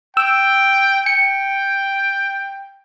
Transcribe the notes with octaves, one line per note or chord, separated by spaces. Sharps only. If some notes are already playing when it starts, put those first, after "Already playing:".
G5 E6
G5 C#7